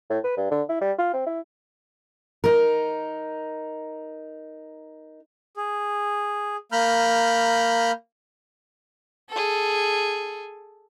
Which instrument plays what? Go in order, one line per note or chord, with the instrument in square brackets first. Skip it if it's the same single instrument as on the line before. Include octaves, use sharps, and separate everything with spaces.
[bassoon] A2
B4
G2
D3
E4
G3
F4
C4
E4
[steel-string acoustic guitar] D#4 A#4
[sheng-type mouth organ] G#4
A#3 A#5 B5 F6 G6
[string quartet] G#4 A4